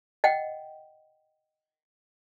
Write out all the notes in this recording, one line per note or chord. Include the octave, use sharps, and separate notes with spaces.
D#5 F#5 G5